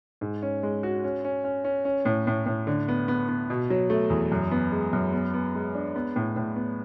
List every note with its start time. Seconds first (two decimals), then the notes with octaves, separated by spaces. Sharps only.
0.21 G#2
0.42 C#4
0.63 G#3
0.83 F#4
1.04 C#4
1.25 C#4
1.44 C#4
1.64 C#4
1.85 C#4
2.05 A2
2.27 A2
2.46 A2
2.67 D3
2.88 B3
3.08 B3
3.28 B3
3.50 B2
3.70 F#3
3.90 A3
4.10 E2
4.32 F#2
4.52 B3
4.72 G#3
4.93 F#2
5.13 B3
5.34 B3
5.55 G#3
5.75 D4
5.96 B3
6.16 A2
6.36 A2
6.56 B3